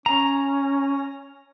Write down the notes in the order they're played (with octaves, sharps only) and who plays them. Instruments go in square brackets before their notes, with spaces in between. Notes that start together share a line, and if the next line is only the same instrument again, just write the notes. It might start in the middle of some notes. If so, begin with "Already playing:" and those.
[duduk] C#4 [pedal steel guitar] A#5